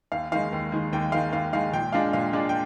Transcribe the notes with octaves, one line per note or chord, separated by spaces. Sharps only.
D#2 F5
D#3 G#3 F5
D#2
D#3 G#3
D#2 G5
D#3 G#3 F5
D#2 F5
D#3 G#3 F5
A#2 G5
G#3 D4 F4 F5
A#2 F5
G#3 D4 F4 D5
G5